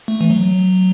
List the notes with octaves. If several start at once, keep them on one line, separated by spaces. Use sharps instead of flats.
A3
E3
F#3